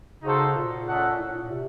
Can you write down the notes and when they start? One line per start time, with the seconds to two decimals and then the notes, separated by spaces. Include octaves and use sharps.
0.23 C#3 D#4 F#4 A4 C5
0.55 A#2
0.87 A3 C#4 A4 D#5 F#5
1.19 A2
1.35 A#2
1.51 C3